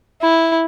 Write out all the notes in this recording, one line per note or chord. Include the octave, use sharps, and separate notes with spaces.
E4